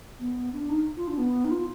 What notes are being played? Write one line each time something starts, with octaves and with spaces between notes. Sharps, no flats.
B3
D4
D#4
F4
D4
B3
D#4
F4